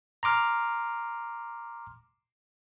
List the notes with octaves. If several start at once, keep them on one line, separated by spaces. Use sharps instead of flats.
A#5 C6 D6 F6